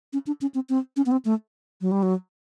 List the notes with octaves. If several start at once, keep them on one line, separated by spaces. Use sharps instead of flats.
C#4
D4
C#4
C4
C4
C#4
B3
C4
A3
F#3
G3
F#3